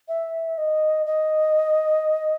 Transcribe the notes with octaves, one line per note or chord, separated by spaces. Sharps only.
E5
D#5
D#5